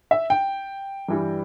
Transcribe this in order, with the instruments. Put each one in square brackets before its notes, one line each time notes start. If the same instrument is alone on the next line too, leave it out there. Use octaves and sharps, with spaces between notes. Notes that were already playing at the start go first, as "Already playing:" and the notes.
[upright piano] E5
G5
G2 E3 G3